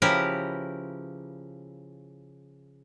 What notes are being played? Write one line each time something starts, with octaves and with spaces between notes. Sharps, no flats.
C#3 F3 E4 G4 A#4 B4